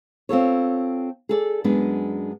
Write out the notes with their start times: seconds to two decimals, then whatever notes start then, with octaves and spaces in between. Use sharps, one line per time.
0.29 C4 F4 A4 C#5
1.29 G#4 A4 D5
1.64 F#2 G#3 B3 D4